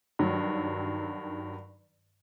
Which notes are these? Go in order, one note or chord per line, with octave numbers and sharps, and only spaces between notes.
G2 D#3 F#3